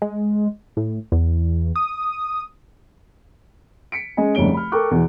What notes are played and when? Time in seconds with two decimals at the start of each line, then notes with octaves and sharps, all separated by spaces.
0.02 G#3
0.77 A2
1.12 E2
1.76 D#6
3.92 B6 C#7 D7
4.17 G#3 C#4 D#5 G#5
4.35 F1 C2 C#3 C#5 D7 G7
4.54 B5 F6
4.72 A4 A#4 G5 C#6 D6 F#6
4.91 E2 B2 E3